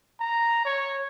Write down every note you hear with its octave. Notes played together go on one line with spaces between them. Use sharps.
A#5
C#5